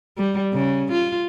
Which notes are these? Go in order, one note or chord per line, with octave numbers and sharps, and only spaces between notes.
G3
C#3
F4